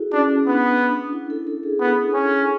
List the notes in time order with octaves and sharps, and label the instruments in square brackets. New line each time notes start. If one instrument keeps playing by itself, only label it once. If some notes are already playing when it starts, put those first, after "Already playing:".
Already playing: [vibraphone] E4 F#4 G#4 A4
[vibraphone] C#4 [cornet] D4
[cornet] B3 [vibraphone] D4
[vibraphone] E4
A4
A4
G#4
[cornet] B3
C#4